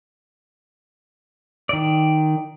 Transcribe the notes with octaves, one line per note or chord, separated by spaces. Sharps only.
D#3 D5